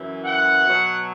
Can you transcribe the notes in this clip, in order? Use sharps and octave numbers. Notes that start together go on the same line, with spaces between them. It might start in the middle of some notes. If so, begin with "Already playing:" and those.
Already playing: F#2 E3
F#5
B2 F#3